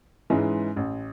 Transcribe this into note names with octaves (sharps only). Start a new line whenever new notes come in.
G#2 E3 G#3 C#4
A1